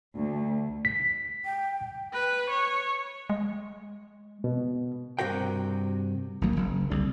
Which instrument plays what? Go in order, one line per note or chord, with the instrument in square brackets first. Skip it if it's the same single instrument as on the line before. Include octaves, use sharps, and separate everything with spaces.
[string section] D2
[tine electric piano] B6
[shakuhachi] G5
[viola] B4
C#5
[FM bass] G#3
[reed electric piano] B2
[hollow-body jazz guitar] G2 C3 F#4 A#4 G5
[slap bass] G#1 D2 F#3 A#3
F#1
C2 D3